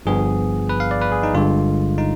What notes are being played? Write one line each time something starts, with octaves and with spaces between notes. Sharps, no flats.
G1 G2 F3 B3 G#4
B4
F5
D5
B4
G#4
D#4
G1 G2 D3 G#3 F4
D#4